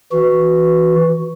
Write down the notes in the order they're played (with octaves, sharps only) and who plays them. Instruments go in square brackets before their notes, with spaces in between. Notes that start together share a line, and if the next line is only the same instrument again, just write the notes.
[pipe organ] E3 F#4